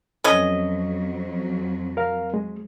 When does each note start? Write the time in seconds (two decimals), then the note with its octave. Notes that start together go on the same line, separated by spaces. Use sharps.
0.24 F2 F#3 C#4 A4 B4 D#5
1.97 A#4 F5
2.34 G#3